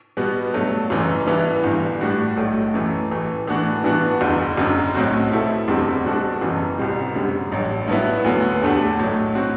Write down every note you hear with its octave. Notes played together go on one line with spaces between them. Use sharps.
B2 G3 B3 F#4
G2 F#3 A3
F#1 F#2 E3
G2 E3 B3 E4
G1 G2 E3
A2 G3 D4 F#4
B1 A2 F#3 A3
F#2 E3 A3
A1 A2 E3 A3
A2 E3 B3 D4 F#4
G2 E3 B3 D4 F#4
F#1 E2 D3
F#1 F#2 D3
B1 A2 F#3 C4 F#4
B2 A3 E4 A4
F#1 E2 D3 G3 C4
B2 G3 D4 F#4 A4
F#1 F#2 E3
C2 B2 G3 C4
F#2 D3 G3
A1 G2 F#3
G2 F#3 B3 E4
D2 D3 F#3 B3
E2 D3 A3 D4 G4
B1 A2 F#3
F#3 C4 F#4